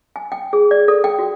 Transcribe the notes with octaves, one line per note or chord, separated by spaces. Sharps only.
G#5
G5
G#4
D5
A4
G5
F#4